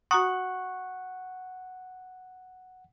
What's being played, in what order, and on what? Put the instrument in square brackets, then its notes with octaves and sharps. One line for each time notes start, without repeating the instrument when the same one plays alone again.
[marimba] F#4 A#5 D#6 [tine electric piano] F#5 [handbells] C#6